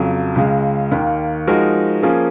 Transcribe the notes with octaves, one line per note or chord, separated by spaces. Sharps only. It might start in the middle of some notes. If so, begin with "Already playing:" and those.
Already playing: F2 C#3 F#3
C#2 C#3 G#3
D#2 D#3 A#3
F3 G#3 D#4 F#4 A#4
F3 A#3 C#4 G#4